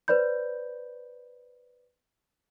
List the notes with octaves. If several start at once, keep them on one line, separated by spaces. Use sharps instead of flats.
B4 C5 D5 B5 G6